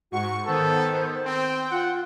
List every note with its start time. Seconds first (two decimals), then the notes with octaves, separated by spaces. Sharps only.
0.12 G#2 F#4 C#6
0.47 D#3 B3 A4 C5
1.26 C4 G5
1.71 F4 F#5